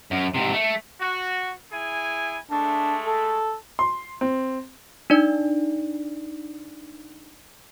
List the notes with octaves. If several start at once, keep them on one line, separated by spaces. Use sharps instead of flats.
F#2
G#2 C3
A3
F#4
E4 G#4 G#5
G#3 A3 D4
A4
C6
C4
D4 D#4 D5